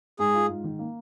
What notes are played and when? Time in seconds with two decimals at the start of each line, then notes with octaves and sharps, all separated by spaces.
0.19 G#2 G#4
0.34 F4
0.49 G#2
0.64 D#3
0.79 A#3